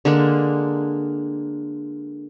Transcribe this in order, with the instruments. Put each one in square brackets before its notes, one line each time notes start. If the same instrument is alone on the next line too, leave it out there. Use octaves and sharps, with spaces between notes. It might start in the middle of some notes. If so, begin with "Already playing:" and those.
[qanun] D3 G#3 A#3 D4